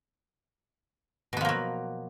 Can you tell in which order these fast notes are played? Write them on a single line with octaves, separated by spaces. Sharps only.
B2 B3 F3 A#3 F#3